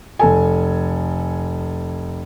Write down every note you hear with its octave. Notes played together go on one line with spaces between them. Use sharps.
F1 A4 G#5